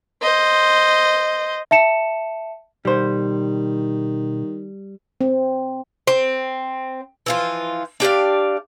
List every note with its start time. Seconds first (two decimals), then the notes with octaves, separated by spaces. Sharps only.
0.22 C5 D#5
1.71 E5 A5 C#7 E7
2.85 B2 D#3 G3 C5
5.21 C4
6.07 C4
7.26 E3 F3 F4
8.00 D4 G4 D5 F5